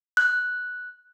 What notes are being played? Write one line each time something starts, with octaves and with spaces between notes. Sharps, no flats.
F#6